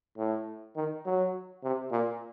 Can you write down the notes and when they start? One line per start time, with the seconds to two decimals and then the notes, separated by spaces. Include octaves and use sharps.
0.18 A2
0.76 D#3
1.05 F#3
1.63 C3
1.92 A#2